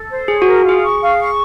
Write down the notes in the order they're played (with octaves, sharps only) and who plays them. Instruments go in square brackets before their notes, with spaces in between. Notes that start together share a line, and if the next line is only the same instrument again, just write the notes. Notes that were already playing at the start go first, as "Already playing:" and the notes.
Already playing: [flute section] A4
C5
[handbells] G#4 [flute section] C#5
[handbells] F#4
[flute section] A#4
[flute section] F4 [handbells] G#4
[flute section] C#6
F5
C#6